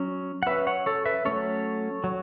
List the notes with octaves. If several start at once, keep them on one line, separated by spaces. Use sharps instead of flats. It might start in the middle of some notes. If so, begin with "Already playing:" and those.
Already playing: F#3 C#4
F#5
F#3 C#4 B4 E5
C#5 F#5
A4 C#5
B4 E5
F#3 A3 C#4 A4 C#5
F#3